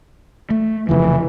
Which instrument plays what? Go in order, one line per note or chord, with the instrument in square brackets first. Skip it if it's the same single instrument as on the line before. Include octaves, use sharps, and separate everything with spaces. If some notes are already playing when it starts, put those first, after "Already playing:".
[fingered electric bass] A3
[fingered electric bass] F1 C#3 F3 [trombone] E3